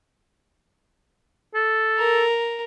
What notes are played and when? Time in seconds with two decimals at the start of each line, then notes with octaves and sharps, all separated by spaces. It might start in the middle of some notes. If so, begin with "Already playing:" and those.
1.55 A4
1.98 A#4